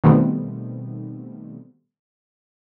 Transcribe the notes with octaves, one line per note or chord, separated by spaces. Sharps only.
B2 D#3 G3 A3 B3 C4